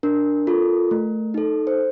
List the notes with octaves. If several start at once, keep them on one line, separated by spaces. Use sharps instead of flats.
D4 A#4
F4 A4
A3
D#4 A4
C5